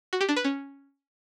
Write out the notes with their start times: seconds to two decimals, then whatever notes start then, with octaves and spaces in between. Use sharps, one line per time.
0.13 F#4
0.21 G4
0.29 D4
0.37 B4
0.44 C#4